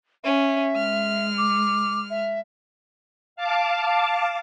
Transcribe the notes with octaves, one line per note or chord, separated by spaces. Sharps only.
C#4 E5
G#3 F6
D6
E5
F5 A5 D6